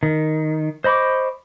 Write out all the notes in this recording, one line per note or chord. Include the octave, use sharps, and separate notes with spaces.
D#3
C5 D#5 B5 C#6 D6